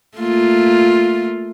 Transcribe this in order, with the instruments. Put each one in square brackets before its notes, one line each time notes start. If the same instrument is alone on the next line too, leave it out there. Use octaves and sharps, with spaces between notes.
[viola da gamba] A3 A#3 F4